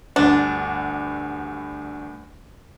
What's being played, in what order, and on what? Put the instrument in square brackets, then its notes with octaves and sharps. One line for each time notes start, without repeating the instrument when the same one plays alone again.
[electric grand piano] D2 G2 F#5 [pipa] D4